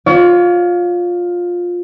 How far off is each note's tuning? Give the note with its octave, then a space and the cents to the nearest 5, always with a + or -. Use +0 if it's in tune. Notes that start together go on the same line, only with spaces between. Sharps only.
F4 +15 C#5 +40